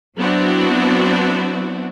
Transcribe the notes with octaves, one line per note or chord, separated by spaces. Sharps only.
F#3 B3 C4 D4 E4 F#4